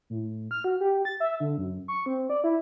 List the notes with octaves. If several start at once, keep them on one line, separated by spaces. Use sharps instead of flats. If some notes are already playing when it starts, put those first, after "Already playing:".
A2
F6
F#4
G4
A6
E5
D3
F#2
C#6
C4
D5
E4